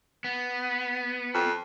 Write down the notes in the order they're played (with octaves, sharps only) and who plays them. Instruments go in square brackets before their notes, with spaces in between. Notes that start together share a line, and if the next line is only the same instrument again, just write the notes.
[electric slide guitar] B3
[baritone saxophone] F2